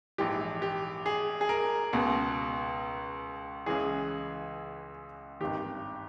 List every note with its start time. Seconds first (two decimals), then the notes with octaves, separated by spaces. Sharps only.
0.18 A#1 G#2 E3 G4
0.62 G4
1.06 G#4
1.41 G#4
1.49 A#4
1.93 C#2 B2
3.66 C#2 C#3 E3 G#4
5.40 G#1 G2 D#3 G4